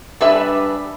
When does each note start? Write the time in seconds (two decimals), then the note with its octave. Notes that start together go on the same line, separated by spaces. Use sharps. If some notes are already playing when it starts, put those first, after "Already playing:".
0.21 G3 D4 B4 E5 G#5